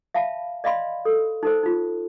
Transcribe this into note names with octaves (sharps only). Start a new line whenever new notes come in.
E5 F5 A5 B5
D5 D#5 F5 B5 C6
A4
D#4 A4 C5
D#4 F4